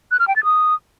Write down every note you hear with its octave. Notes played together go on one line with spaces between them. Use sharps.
F#6
F6
G5
A6
D#6